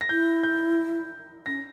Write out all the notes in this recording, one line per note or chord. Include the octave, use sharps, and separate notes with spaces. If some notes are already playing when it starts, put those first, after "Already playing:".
A#6
E4 G6
G6
C#4 A#6